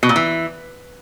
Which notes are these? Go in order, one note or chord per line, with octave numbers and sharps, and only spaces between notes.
B2
A#2
E3